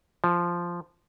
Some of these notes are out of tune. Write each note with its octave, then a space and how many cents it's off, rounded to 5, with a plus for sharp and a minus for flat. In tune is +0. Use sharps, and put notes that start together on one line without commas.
F3 -5